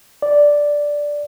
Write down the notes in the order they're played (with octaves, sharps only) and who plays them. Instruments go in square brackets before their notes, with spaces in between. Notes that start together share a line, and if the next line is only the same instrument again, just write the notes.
[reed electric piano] D5